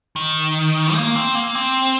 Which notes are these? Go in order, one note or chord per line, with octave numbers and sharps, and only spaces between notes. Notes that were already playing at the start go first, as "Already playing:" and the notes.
D#3
A#3
C4
A#3
C4